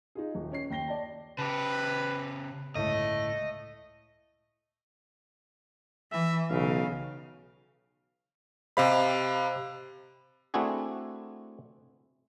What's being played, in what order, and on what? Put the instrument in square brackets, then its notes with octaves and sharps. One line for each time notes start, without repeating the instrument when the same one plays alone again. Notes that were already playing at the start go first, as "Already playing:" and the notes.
[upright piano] D#4 F4 G#4
D#1
C#4 C#5 C7
D#2 G5 A#6 G7
D5 A5
[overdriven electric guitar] C#3 G4 [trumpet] B4 [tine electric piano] A5
[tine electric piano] G1 C#2 A2 [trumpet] A3 [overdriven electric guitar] D#5
[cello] E3 [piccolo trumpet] E5
[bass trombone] B1 [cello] C#3 [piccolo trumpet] F5
[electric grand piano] C3 F5 B5 [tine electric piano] G4 C5 D#5
[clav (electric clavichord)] A3 C4 D4 E4 F#4 G#4